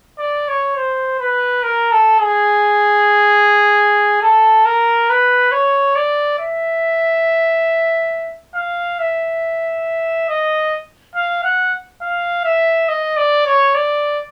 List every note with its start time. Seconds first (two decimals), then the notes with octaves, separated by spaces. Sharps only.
0.18 D5
0.48 C#5
0.76 C5
1.20 B4
1.63 A#4
1.92 A4
2.20 G#4
4.22 A4
4.65 A#4
5.09 B4
5.52 C#5
5.96 D5
6.39 E5
8.55 F5
8.99 E5
10.29 D#5
11.16 F5
11.44 F#5
12.02 F5
12.45 E5
12.88 D#5
13.17 D5
13.46 C#5
13.75 D5